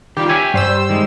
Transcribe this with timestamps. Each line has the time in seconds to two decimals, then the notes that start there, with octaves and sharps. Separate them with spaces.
0.17 D#3 G3 F4 G4
0.29 C#5 E5 G#5
0.54 G2 G3 C5 E6
0.89 D#3 G#3